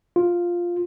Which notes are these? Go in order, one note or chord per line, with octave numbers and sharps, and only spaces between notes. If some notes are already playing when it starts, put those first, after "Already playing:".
F4